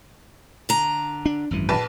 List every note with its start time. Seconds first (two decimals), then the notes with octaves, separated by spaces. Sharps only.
0.69 D3 A#5
1.26 D4
1.51 G#1 F#2 E3
1.69 A#1 B4 A5